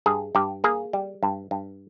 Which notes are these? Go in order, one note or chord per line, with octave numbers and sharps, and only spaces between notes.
G2 G#4
G2 G4
A#3 G#4
G3
G2
G2